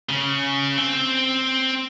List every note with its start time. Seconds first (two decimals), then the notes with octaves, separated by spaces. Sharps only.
0.09 C#3
0.77 C4